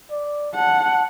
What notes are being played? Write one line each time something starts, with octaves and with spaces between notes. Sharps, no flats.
D5
F#5 A5